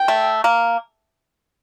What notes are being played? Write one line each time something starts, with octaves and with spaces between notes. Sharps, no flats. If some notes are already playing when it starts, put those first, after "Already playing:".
Already playing: G5
A3
A#3